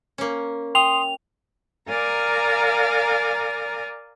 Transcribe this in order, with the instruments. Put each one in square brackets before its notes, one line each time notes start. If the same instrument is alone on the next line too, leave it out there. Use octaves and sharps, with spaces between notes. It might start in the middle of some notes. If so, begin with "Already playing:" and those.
[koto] A#3 C#4
[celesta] G5 [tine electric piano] C6 D#6 [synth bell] F7
[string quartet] A#4 D5 F5 G#5 A#5